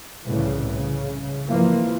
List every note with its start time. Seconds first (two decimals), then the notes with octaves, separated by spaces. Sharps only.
0.25 C2 A2 C#3 E3
0.73 C#3
1.46 G#1 E3 F3 A#3